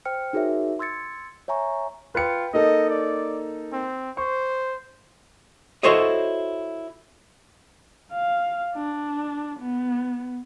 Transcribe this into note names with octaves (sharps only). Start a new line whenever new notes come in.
C5 G5 F6 C#7
D#4 F#4 G#4 A#4 C#5 E5
C6 E6 G#6 A6 C#7
C#5 E5 G#5 A#5 C#6
F4 B4 G5 C#7
A#3 D#4 A4 D#5
D5
C4
C5 C#6
E4 F#4 A4 C5 C#5 D#5
F5
D4
B3